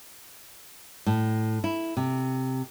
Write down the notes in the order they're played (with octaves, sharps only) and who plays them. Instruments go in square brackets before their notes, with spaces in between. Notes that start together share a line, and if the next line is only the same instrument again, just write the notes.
[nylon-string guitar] A2
E4
C3